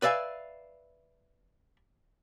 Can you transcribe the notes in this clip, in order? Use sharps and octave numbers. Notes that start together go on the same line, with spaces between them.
B4 D5 E5 F5 G#5